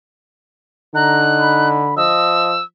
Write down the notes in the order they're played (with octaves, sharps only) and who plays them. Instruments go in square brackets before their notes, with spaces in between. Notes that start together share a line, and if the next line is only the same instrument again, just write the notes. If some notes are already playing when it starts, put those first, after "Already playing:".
[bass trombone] D3 [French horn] D#4 [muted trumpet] A#5 [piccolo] F#6
[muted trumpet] B5
[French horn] F3 [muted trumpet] D#5 [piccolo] E6